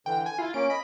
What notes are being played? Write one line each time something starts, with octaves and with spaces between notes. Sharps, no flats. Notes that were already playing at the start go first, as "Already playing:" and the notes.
D3 E3 G5
G#5
E4 F4
A#3 C#4 D7
D#5 B5